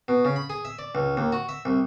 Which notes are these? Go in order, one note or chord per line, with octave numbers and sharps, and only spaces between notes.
B2
C#3
B5
G#4
E5
D5
C#2
D#2
F#4
E5
C2